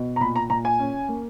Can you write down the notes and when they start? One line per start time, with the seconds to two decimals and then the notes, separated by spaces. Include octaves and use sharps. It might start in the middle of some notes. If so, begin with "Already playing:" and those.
Already playing: B2
0.16 A#5
0.21 A#2 B5
0.36 A#5
0.50 A#2 A#5
0.65 G#5
0.79 C#4
1.09 A#3